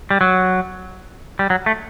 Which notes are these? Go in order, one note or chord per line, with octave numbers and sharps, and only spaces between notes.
G3
F#3
G3
F#3
A3